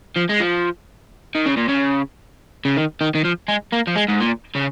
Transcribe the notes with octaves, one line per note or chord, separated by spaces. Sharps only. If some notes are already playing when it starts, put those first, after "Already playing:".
F3
G#3
F3
D#3
C#3
A#2
C#3
C#3
D#3
D#3
D#3
F3
G#3
A#3
F3
G#3
G#2
A#2
C#3